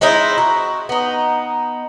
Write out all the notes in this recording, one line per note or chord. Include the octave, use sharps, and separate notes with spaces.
G#3 C4 D#4 E4
F#4
B3 D#4